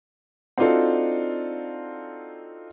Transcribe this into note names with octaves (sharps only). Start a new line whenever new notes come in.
C4 D4 D#4 F4 F#4 A4